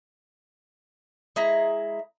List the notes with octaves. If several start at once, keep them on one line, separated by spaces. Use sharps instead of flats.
G#3 E4 A#5